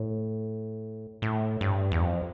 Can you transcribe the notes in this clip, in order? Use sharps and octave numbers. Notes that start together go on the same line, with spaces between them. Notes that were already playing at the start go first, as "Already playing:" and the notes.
Already playing: A2
A2
G2
E2
F2